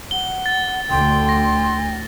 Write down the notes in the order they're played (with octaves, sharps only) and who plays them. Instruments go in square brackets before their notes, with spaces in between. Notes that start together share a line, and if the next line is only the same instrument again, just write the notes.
[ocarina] F#5 [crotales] G7
[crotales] A6
[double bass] D2 D3 [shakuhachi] G5 [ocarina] C6
[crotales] A#6